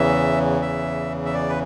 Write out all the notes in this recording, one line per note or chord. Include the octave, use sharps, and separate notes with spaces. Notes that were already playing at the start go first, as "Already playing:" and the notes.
Already playing: E2 C#3 E3 E5
E5
E5
D5
B4